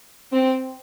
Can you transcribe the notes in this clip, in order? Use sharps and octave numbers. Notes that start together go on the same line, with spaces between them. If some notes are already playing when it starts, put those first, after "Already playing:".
C4